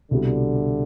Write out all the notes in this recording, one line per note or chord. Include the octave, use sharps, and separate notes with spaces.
C2 B2 D3 G3